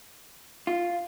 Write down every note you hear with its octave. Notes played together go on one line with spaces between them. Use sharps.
F4